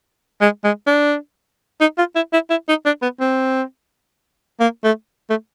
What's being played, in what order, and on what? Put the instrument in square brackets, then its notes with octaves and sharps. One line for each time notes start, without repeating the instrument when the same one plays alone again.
[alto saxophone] G#3
G#3
D4
D#4
F4
E4
E4
E4
D#4
D4
B3
C4
A#3
A3
A3